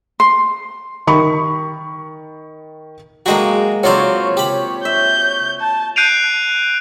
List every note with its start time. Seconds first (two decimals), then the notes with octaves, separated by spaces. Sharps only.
0.20 C6
1.07 D#3 B5 C#6
3.26 F#3 G#3 A#3 F#4 G5 A5
3.84 F#3 C4 F4 A#4 C#5 D5 C6
4.37 G4 B5
4.85 E5 G6
5.61 A5
5.96 F#6 G6 C7 D7 D#7 F7